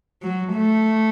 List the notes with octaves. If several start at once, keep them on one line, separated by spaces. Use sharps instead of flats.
F#3
A3